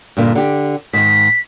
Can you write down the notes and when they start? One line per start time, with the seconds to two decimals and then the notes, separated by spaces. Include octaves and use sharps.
0.17 G2 A#2 D3
0.35 D3 G4
0.93 G#2 D#3 B6